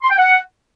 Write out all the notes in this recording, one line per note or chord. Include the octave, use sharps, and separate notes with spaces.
C6
G5
F#5